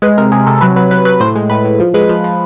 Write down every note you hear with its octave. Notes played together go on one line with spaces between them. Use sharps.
G#3 B4
C3 A#4
C3 G#4
C3 A4
F#3 B4
F#3 B4
F#3 B4
F#3 B4
A2 C5
G#3
A2 B4
A2
F3
G#3 B4
F3
F3